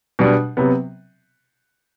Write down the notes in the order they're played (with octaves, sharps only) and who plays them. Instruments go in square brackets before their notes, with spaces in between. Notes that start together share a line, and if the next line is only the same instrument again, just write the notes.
[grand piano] B2 G3 D4
C3 F#3 B3